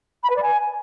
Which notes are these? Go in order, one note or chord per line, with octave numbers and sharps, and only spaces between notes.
B5
B4
D5
G#5